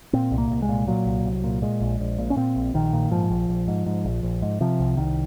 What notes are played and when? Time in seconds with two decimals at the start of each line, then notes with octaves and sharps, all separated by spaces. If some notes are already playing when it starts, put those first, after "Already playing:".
0.13 A#2 C4
0.31 C2
0.38 A#3
0.51 C2
0.62 G#3
0.69 A#2
0.87 A#2 F#3
1.06 C2
1.24 C2
1.44 A#2
1.62 A#2 G#3
1.81 A#1
2.00 A#1
2.18 A#2
2.30 C#4
2.37 A#2 C4
2.56 A#1
2.74 A#1 D#3
2.93 A#2
3.11 G#2 F3
3.30 A#1
3.49 A#1
3.68 G#2
3.86 G#2
4.05 A#1
4.23 A#1
4.42 G#2
4.61 C3 F3
4.80 C2
4.97 C2 D#3